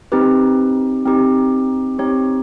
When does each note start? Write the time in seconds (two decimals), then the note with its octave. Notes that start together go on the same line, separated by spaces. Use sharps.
0.12 C4 D#4 G4 B4
1.06 C4 D#4 G4
1.99 C4 D#4 G4 C#5